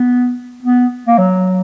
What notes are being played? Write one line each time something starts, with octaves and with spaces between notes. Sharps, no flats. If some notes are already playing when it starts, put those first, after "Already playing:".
Already playing: B3
B3
A#3
F#3